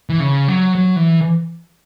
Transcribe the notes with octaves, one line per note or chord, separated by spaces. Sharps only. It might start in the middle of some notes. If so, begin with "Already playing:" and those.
E3
C#3
F#3
F#3
E3